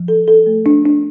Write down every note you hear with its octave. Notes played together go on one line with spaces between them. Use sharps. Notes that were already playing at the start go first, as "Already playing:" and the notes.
Already playing: F3
A4
A4
A3
D4
D4